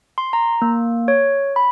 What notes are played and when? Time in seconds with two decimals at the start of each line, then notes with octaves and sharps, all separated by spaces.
0.18 C6
0.33 A#5
0.62 A#3
1.08 C#5
1.56 B5